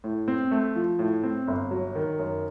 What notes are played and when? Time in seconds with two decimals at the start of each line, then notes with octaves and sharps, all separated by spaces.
0.04 A2
0.28 C4
0.51 A3
0.76 F3
0.99 A2
1.24 C4
1.48 G1
1.71 F#3
1.95 D#3
2.19 F#2